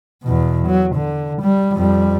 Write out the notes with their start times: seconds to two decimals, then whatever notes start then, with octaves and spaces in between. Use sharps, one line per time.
0.23 E2 B2
0.67 F#3
0.95 D3
1.41 G3
1.75 F2 G3